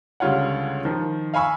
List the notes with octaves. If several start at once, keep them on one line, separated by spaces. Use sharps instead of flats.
C#2 D3 G3 F4 C#5 F#5
D#3 F3
F5 G#5 B5 C#6 E6